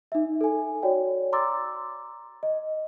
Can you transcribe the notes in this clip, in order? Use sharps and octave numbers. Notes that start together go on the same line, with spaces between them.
D#4 E5
A4 G#5
F#4 C#5 D5 G5
A#5 C6 D6 E6 A6
D#5